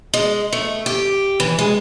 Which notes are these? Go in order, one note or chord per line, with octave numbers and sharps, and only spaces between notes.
G#3
A3
G4
E3
G#3